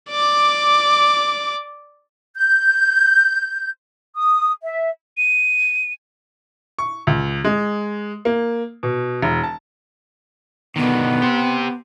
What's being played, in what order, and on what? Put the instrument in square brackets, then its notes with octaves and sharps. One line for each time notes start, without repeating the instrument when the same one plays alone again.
[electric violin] D5 D6
[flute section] G6
D#6
E5
[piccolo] D#7
[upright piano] C#6
C#2
G#3
A#3
B2
E1
A5
[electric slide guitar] B2 D3 D#3 [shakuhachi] B3
[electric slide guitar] G4 C5